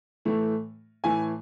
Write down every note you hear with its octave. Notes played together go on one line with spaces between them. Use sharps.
A2 E3 A3
A2 E3 A3 G#5